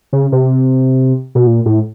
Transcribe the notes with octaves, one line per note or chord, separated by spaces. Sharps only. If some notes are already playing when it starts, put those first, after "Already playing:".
C#3
C3
B2
A#2
A2